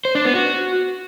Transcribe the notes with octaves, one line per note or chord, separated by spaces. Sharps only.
C5
D4
B3
F#4